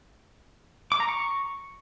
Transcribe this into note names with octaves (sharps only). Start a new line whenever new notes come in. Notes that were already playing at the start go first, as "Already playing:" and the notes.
D6
A#5
C#6